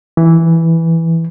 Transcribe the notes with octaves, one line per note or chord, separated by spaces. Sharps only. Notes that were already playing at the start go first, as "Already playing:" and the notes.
E3